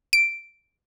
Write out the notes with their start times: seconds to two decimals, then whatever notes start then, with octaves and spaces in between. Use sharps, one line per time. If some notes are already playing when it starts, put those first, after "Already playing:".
0.13 D7